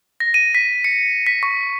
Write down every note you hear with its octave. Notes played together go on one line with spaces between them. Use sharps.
A#6
D#7
B6
C#7
B6
C#6